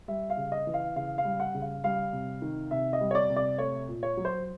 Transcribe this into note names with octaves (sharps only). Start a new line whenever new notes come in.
G3 E5
F5
C#3
D#5
E3
F5
C#3 F5
F5
G3
F#5
C#3
F5
G3 F5
C3
D#3
C3 E5
D#5
G3
C#5
D5
C3
D5
A3 C#5
A#2
C#5
F#3
C5